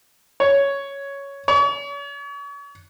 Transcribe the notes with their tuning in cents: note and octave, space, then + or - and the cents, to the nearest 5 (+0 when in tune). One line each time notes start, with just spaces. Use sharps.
C#5 +5
C#5 +40